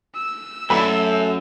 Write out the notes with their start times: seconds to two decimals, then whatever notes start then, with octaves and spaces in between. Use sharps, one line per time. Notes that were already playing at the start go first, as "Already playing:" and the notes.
0.15 E6
0.70 F#2 A3 B5